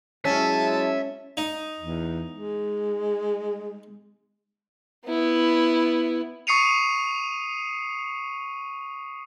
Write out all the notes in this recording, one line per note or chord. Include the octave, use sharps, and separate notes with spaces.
F#3 G#3 C#4 E4 E5 A5
D#4
E2
G#3
B3 E4
C#6 D#6 C7 C#7 D#7 F7